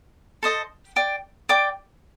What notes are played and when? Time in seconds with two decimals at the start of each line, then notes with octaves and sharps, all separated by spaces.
0.43 A4 C5 D#5 A5
0.96 D5 G5 D6
1.49 D5 G5 D6